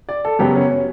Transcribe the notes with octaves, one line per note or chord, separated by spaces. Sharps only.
D5
A4
F#2 C#3 F#3 B3 G4
C#4
C#4